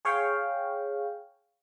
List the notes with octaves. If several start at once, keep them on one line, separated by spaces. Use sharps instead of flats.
G#4 C#5 F5 G5